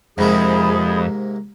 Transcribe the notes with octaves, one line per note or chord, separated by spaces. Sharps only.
F2 G#2 C3 A#3 G#4 B5 D#6